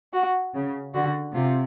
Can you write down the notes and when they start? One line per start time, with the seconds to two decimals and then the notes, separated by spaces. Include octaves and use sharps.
0.13 F#4
0.54 C#3
0.94 D3 F#4
1.34 C3 F4